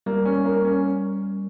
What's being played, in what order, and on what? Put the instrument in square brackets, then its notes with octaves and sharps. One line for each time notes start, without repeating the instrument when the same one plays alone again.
[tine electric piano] G3 [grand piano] A#3
[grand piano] C#4
A#3
C#4